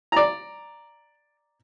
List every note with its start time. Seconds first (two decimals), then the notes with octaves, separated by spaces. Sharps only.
0.12 D5 A#5